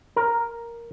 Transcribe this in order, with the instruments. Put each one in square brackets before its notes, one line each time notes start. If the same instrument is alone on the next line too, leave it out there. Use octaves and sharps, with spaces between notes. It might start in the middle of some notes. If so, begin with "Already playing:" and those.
[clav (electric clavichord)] A#4